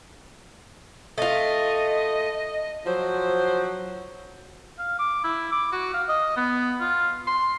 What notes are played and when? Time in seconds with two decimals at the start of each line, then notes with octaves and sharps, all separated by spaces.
1.18 A3 F4 D#5
2.85 F3 F#3 C5
4.79 F5
4.99 D6
5.24 E4
5.52 D6
5.73 F#4
5.94 F5
6.09 D#5
6.37 B3
6.81 F4
7.27 C6